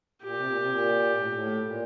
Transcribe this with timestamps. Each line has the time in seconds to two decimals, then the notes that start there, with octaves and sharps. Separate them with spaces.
0.23 A#2 G4
0.36 C3
0.47 A#2
0.58 C3
0.69 A#2
1.17 A2
1.25 A#2
1.33 A2
1.64 A#2